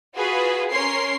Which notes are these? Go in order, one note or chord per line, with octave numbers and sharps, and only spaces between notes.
F4 F#4 G#4 B4
C#4 A#4 C#5 C6 C7